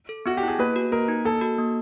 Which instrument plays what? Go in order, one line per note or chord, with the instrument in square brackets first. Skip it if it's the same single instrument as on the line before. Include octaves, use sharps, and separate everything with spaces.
[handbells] A4
[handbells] B3 [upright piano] F#4
[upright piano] G4
[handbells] E4
[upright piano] G#4
[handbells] A#3 [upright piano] B4
[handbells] F#4
[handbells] A#3 [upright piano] A#4
[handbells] D#4
[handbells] A#3 [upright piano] A4
[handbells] F#4
A#3